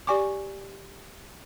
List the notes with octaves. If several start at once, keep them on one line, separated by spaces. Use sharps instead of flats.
G4 D5 G#5 C#6 D6